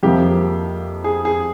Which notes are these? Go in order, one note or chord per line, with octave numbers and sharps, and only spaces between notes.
F2 C3 F3 A#3 G4
G#4
G#4